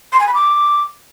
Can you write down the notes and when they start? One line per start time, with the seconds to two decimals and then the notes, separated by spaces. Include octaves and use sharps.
0.12 C6
0.20 G#5
0.27 B5
0.35 D6